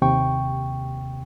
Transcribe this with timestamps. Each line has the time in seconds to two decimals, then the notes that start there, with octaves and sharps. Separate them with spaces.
0.02 D#2 C3 G5 C#6